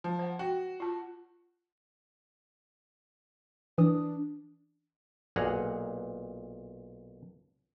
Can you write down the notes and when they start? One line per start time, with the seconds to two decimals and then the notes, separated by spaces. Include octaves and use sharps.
0.04 F3
0.19 C5 F#5
0.39 F#4 G5
0.80 F4 A5
3.78 E3 D4 D#6
5.36 B1 A#2 G#4 F#5 A#5